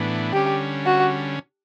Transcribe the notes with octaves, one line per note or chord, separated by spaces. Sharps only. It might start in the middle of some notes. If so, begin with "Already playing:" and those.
Already playing: A2 E3 B3 D4
D3 G3 C#4 G4
F#4